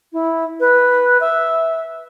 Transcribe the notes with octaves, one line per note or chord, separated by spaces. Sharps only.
E4
B4
E5